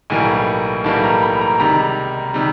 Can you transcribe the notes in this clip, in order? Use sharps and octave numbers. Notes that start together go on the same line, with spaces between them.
B1 A2 E3 G3 A#3 G#5
B1 A2 E3 G3 A#3 A5
A#5
B5
A#5
C#2 C3 D#3 G3 A#5
C3 D#3 G3